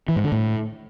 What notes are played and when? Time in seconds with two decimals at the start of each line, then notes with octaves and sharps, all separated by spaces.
0.08 E3
0.16 G#2
0.24 D3
0.32 A2